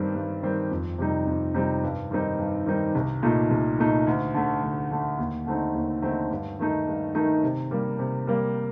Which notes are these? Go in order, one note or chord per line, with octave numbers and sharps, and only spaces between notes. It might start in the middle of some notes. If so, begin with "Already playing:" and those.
Already playing: G2 D#3 G3 C4
G2
D#3 G3 C4
F2
C3 G3 C4 D#4
F2
C3 G3 C4 D#4
G2
D#3 G3 C4 D#4
G2
D#3 G3 C4 D#4
C2
A#2 A3 D#4
C2
A#2 A3 D#4
D2
D3 A3
D2
D3 A3
D#2
D3 A3 C4 D#4
D#2
D3 A3 C4 D#4
G2
D#3 A3 D#4
G2
D#3 A3 D#4
C3
G3 A#3
C3
G3 A#3